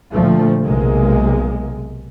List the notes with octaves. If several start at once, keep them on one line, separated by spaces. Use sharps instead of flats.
D2 A#2 F3 A3
B1 C3 G#3 A#3